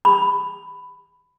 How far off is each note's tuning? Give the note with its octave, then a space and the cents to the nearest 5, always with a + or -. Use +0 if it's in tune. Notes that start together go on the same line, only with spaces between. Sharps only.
B5 +10